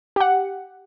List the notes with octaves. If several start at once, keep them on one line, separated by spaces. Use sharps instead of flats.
G4 F#5